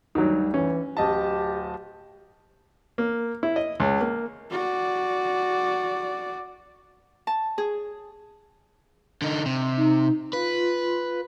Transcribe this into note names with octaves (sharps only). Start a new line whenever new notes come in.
D2 D#3 F#3 G3
E3 C#4
D1 G4 D#5 A5
A#3
E4
D#5
C#2
A#3
F#4 D5
A5
G#4
D3 D#4
C3
D#4
F4 B4